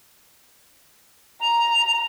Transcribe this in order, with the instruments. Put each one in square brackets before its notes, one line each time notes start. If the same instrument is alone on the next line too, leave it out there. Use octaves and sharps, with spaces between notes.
[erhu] A#5 [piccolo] F7